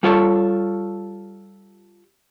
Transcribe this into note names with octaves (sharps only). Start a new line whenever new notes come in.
G3 F4 A4 C#5